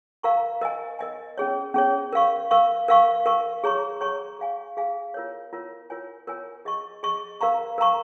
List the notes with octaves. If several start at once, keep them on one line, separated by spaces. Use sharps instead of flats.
A#4 F5 A#5 C#6
A#4 D#5 G#5
A#4 D#5 G#5
C#4 G#4 C#5
C#4 G#4 C#5
A#4 F5 C#6
A#4 F5 C#6
A#4 F5 C#6
A#4 F5 C#6
G#4 C#5 A#5 C#6
G#4 C#5 A#5 C#6
G#4 F5 G#5
G#4 F5 G#5
F4 A#4 C#5
F4 A#4 C#5
F4 A#4 C#5 G#5
F4 A#4 C#5 G#5
G#4 D#5 C#6
G#4 D#5 C#6
A#4 F5 A#5 C#6
A#4 F5 A#5 C#6